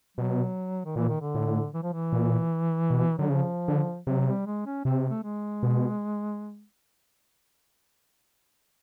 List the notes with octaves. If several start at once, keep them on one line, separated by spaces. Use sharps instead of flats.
B2 F#3
D#3
A#2 E3
D#3
D3
A2
E3
F3
E3
A#2
B2
D3 F#3
C#3 F3
D3
C3 F#3
G3
G#3
C#4
C3 C4
A3
G#3
B2